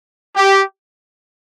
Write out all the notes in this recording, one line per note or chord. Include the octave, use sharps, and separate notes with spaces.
G4